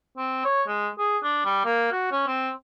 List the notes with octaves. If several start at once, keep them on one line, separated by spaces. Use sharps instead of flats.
C4
C#5
G#3
G#4
D4
G3
A#3
F#4
C#4
C4